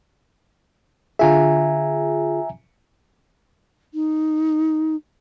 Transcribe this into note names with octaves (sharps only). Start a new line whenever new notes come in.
D3 F4 G#4 E5 G#5 A#5
D#4